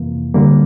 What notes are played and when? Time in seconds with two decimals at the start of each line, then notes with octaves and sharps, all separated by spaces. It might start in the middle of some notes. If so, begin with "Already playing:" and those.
Already playing: F2 C3 E3 A#3
0.34 D2 D3 G3 A#3